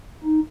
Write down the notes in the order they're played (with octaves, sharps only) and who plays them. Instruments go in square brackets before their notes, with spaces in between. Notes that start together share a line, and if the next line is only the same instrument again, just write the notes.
[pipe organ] D#4